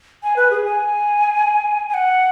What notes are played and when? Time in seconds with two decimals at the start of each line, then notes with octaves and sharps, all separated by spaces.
0.23 G#5
0.36 B4
0.51 G#4
0.64 G#5
1.89 G#5
1.94 F#5